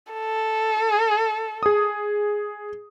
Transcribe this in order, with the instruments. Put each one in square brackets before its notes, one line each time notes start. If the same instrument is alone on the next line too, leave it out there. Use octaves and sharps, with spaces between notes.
[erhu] A4
[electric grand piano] G#4 D#6